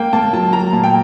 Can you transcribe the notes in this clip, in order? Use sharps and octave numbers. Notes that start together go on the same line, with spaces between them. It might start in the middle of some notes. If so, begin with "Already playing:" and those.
Already playing: A#3 G5
A#3 A5
F#3 A5
F#3 A#5
A#2 A5
G5